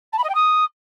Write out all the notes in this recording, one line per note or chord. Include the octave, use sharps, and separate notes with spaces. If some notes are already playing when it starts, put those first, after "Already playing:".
A5
B5
D#5
G5
D#6